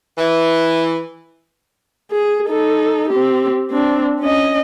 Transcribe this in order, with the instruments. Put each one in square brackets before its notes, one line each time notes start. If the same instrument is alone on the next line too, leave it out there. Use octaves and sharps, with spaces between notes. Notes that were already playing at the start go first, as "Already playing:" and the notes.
[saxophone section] E3
[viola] G#4
D#4 A4
C4 G4
C4 D4
C#4 D#5